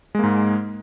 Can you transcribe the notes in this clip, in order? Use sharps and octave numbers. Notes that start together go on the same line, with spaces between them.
G#2 G#3 A#3